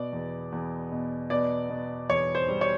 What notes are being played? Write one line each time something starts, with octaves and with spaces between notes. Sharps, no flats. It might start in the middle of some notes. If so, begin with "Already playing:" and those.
Already playing: B2 D5
E2
E2
B2
B2 D5
B2
E2 C#5
C5
G3
C#5